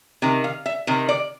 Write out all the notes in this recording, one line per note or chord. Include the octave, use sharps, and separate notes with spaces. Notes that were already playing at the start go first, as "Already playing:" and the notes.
C3 D#3
F5
E5
C3 D#3
D5